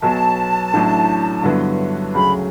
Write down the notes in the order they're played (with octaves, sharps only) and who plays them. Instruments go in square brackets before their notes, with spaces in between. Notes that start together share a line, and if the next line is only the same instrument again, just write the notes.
[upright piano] B1 B2 F#3 [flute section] A5
[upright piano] A1 A2 F#3 A3 D4
G2 D3 F#3 B3 E4
[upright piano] D2 C#3 F#3 [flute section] B5